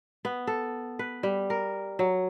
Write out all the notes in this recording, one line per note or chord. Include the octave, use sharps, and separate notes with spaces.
B3
A4
B4
G3
A#4
F#3